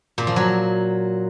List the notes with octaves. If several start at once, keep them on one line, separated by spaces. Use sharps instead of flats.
A#2
F3
F#3